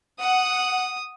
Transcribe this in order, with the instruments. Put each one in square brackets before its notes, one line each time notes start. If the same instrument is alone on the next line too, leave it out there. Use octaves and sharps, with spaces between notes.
[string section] F#5 [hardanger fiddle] D#6